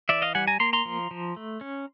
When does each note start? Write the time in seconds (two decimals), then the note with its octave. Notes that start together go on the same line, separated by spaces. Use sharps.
0.09 E3 D5 E5
0.22 D#5 F5
0.35 G3 F#5 G#5
0.48 G#5 A#5
0.60 A#3 A#5 C6
0.73 A#5 C6
0.85 F3
1.11 F3
1.36 A3
1.61 C#4